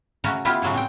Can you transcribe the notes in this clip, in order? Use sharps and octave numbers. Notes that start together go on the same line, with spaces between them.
C#3 A3 C#4 F#4 A#5
B3 E4 F4 G4
A2 C#3 F#3 G#3 G#4
C4 G5